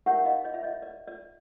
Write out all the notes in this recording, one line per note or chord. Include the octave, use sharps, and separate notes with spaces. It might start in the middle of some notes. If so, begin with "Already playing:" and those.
D#4 G4 A#4 C#5 E5 F#5
D#5 F5
C#5 D#5
E5
C#5 D#5
D5
D5